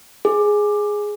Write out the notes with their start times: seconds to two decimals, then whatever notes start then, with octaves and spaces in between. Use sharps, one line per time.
0.25 G#4